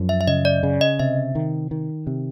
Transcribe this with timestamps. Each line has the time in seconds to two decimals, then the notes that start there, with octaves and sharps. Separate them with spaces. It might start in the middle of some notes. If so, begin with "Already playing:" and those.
Already playing: F#2 F3
0.09 E5
0.21 E5
0.27 C#3 D#5
0.45 D5
0.63 C#3
0.81 D#5
0.99 C3 E5
1.35 D#3
1.71 D#3
2.07 C3